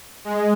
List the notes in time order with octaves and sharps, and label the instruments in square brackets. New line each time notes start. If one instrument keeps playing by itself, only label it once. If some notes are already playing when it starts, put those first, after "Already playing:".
[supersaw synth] G#3